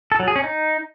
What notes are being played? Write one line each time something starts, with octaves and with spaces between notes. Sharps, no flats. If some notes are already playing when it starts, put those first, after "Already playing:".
A4
F#3
G#4
C#4
D#4